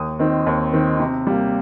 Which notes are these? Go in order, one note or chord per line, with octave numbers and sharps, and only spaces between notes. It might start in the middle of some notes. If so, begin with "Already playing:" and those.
Already playing: D#2 D#6
D#3 C4 D#4
D#2
D#3 C4 D#4
C3
G3 A#3